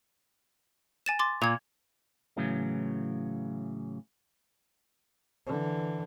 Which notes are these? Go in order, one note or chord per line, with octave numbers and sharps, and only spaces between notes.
G#5 A6 E7
C6 D6 A6
A#2 G#6 F7
A2 C#3 E3 F#3
D3 E3